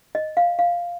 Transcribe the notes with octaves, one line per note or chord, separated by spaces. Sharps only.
D#5
F5
F5